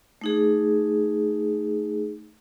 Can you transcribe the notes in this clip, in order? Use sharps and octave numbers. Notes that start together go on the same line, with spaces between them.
A3 D#4 G#4